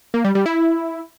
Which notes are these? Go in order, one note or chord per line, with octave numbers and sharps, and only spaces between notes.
A#3
G3
G3
E4